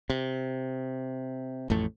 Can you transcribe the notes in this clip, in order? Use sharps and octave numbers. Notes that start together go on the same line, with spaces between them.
C3
A1 F2 A2 A3